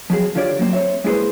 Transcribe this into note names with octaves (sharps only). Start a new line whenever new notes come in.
F3 F#3 C4 G#4
D3 F4 G4 C#5 D5
F#3 A#3 C4
C4 C#5 E5
G#3 A#3 E4 G#4 B4 C5